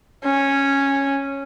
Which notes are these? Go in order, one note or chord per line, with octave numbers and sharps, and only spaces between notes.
C#4